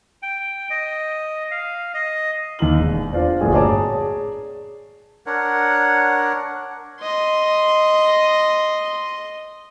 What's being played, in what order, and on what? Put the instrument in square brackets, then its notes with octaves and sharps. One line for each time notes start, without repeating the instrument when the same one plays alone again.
[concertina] G5
D#5
F5
D#5
[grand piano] D#2 D#4 F#7
E1
D4 F4 C5 D5
D1 G1 A#2 F#4 G#4 G#5
G#4 C#5 D5 A5 A#5 D6
[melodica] D4 A#4 C#5 F#5
[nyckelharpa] D#5 C6